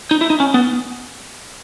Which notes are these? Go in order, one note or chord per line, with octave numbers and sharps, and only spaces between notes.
D#4
E4
D#4
C#4
B3